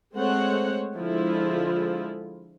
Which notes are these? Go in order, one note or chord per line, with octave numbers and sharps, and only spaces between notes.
G#3 A3 C4 C5 C#5 F#5
D3 F3 G#3 E4 F4